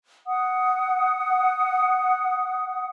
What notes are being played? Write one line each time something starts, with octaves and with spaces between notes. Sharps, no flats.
F#5 D#6